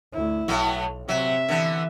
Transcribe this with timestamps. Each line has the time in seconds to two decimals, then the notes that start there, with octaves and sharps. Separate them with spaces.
0.13 D2 E4
0.48 B1 A2 F#3 B3
1.08 C3 F#3 E5
1.49 D3 E3 B3